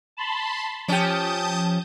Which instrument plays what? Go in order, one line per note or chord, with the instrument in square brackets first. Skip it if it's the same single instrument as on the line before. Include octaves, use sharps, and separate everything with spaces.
[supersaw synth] A5 B5 C6
[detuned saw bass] F3 [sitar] C#4 G4 [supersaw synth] A5 D#6 G6